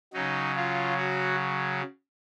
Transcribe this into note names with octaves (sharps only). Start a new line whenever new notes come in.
C#3 F#3 D#4
F4
F#4